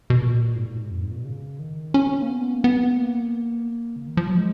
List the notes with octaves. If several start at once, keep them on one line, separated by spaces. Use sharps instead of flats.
B2
A#2
G#2
A#2
G#2
F2
G#2
A#2
B2
C#3
D#3
C#4
A#3
B3
A#3
B3
A#3
C#3
D#3
F3
F#3
G#3